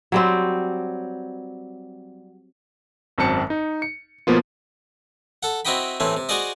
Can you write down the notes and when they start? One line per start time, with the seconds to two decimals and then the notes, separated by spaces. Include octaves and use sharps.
0.12 F#3 G3 C4
3.18 G#1 F#2 C4 A5 C#7
3.50 D#4
3.82 C#7
4.27 B2 F3 A#3 B3 F4
5.43 A4 F#5
5.65 C4 E4 F#4 D#5 G5 B5
6.00 A2 C3 E3 C4
6.17 C3
6.29 F#4 G#4 C5 D5 D#5